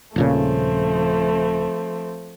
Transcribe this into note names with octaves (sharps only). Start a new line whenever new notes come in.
D#1 A#2 C#3 F3 A3 C4